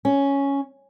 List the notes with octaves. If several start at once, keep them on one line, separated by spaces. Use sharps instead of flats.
C#4